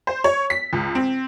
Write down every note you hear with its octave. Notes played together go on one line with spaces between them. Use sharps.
C5
C#5
B6
C#2
C4